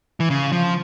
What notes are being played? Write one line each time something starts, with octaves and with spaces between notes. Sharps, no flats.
E3
C#3
F3